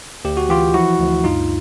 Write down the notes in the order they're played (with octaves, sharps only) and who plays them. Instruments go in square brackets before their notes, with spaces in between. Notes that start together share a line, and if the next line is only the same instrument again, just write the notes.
[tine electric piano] D2 G4
F#4
E3 F4 G4
F3 E4 F#4
D2
G2 D#4 F4